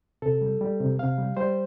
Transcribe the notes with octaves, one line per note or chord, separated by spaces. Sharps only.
C3 A4
G3
G3
C3
C3 F5
G3
G3 C5